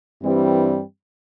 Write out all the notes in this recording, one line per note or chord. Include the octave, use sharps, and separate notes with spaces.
G2 E3 G3 C4